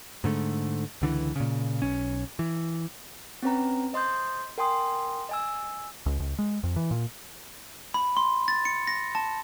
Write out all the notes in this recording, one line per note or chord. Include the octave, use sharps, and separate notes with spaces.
G#2 D3 A3
C#2 D3 E3
A#2 C#3
B1 C#4
E3
C4 C#4 B4 A#5
C5 D#5 C6 D#6 G6
A#4 G5 G#5 C6 D#6
D#5 G#5 E6
C#2
C#2
G#3
F2
E3
A#2
B5
C6
A6
C#7
A#6
A5